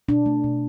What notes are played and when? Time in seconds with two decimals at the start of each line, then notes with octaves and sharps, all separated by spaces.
0.08 B2 D4
0.26 A3
0.44 B2